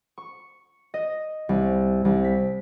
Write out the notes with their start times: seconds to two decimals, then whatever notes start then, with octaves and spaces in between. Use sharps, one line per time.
0.18 C#6
0.94 D#5
1.49 C2
2.05 C2
2.24 B6